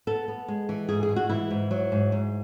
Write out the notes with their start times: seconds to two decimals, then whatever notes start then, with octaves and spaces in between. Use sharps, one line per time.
0.07 B3 A4
0.28 B3
0.48 G#3
0.69 E3
0.89 G#2 G#4
1.03 G#4
1.09 G#3
1.16 F#4
1.29 E3 E4
1.51 G#2
1.71 F#3
1.92 G#2
2.12 G#2